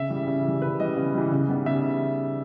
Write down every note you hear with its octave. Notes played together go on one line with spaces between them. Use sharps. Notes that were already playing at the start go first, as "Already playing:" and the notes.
Already playing: C#3 E5
E3 G3
C#3
E3 G3
C#3 B4
E3 G3 D#5
C#3
E3 G3
C#3
G3 B3 D#4
C#3 E5